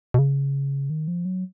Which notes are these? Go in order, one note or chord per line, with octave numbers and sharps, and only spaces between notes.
B2
C#3
D#3
F3
F#3